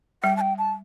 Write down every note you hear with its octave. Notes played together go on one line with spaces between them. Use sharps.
G3 G5
A5
G5
A5